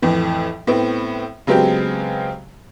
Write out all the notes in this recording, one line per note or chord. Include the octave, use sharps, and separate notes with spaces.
F2 A2 E3
A2 B3 C4
C#3 F#3 G#3 B3 C4 G4